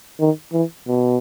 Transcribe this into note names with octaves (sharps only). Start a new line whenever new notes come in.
D#3
E3
B2